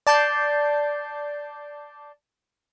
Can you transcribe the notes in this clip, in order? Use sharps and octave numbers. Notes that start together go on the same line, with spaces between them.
D5 A5 D6 G6 C7